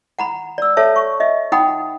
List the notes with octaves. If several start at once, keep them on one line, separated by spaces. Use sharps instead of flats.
F#5 A#5 B5
D5 E6
A4 C#5 E5 A5
C#6
D#5 E5
D#4 F#5 G5 B5 D#6